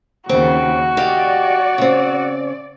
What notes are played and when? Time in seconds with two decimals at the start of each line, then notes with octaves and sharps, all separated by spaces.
0.29 D#2 C#3 C4 F#4
0.97 G4 D5 D#5 F5
1.78 C#3 C4